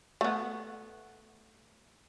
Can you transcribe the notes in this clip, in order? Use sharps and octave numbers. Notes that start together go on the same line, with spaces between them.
A3 B3